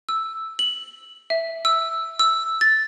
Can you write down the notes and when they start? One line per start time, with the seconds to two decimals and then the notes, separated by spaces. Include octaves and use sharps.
0.09 E6
0.59 F#7
1.30 E5
1.65 E6
2.19 E6
2.61 A6